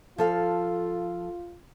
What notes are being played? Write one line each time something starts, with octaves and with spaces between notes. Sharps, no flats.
F3 F4 A4 F5